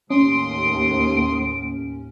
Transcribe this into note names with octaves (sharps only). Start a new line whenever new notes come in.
D#2 A2 C#4 C6 D#6 D7